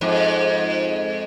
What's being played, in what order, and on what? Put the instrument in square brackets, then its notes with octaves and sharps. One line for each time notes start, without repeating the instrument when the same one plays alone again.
[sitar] F2 G#2